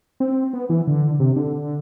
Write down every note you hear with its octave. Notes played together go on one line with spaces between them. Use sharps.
C4
B3
E3
D3
C3
D3